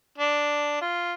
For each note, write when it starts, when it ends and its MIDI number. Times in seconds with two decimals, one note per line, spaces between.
0.18 0.77 62
0.81 1.14 65